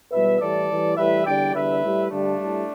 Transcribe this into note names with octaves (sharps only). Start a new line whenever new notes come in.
E2 B2 G3 B4 E5
A2 E3 G3 A4 D5
A2 E3 G3
A2 E3 G3 B4 E5
E2 D3 G3 D5 G5
E2 D3 G3 B4 E5
A2 G3
G2 D3 G3 A3 D4
A2 G3